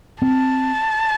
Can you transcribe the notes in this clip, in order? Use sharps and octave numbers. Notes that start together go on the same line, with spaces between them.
C4 A5